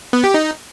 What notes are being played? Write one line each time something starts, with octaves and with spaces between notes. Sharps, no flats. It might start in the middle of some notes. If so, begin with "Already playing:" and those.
B3
G4
D#4